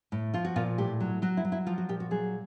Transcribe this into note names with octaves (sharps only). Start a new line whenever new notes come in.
A2
F3 F4
F#4
A#2 F4
A2 G4
F#3
F#3 F#4
E4
F#3
E4
F3 F4
F#4
A#2 G4
F#4
F#3 G#4